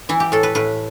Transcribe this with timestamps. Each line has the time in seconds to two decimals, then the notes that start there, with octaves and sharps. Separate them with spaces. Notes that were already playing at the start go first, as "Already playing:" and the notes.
0.09 E3 E4
0.20 G4
0.32 A2 A4
0.43 B4
0.55 A2 B4